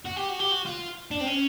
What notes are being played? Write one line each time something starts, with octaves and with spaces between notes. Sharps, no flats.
F#4
G4
F#4
G4
F#4
F4
D4
C4
C#4